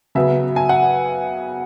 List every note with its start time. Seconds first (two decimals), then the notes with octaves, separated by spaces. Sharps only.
0.15 C#3 F#3 B3 E5
0.56 G#5
0.69 F#5